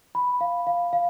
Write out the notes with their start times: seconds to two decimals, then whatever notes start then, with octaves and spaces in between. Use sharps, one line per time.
0.15 B5
0.41 F5
0.67 F5
0.93 F5